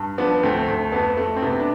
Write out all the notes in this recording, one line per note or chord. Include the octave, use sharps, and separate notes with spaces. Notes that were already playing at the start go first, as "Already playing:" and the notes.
Already playing: G2
F3 B3 D4
D2 A3 C4
D2 A3
F2 B3
F2 A3
C4
C3 B3
D4